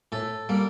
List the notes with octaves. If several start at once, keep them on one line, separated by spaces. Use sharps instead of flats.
A2 A4
G3 A#3